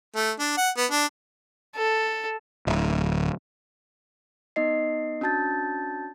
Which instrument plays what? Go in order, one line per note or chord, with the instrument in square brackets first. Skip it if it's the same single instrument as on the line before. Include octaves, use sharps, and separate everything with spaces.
[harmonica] A3
D4
F#5
B3
D4
[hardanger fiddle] A4
[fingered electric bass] D1
[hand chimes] B3 D#4 D#5 C7
C#4 D4 F#4 A5 G6 A6